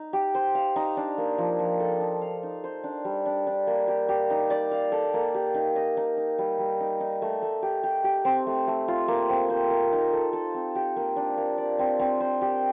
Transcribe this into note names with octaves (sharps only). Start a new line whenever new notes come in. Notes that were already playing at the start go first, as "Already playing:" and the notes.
Already playing: D#4
G4
C5
F5
D#4
D4
A#3
F3
F3
A4
D#4
F5
D#4
C5
D4
G3
D4
D4
A#3
G4
G4
D#4
D5
F5
A4
A#3
G4
D#4
D#5
D#4
D#4
G3
G3
D#4
D#4
A3
A3
G4
G4
G4
C4
A3
A3
F4
A#3
C4
C5
A#4
D#4
A4
A4
C4
G4
A#3
D4
A#3
D5
C4
C4
C5
G4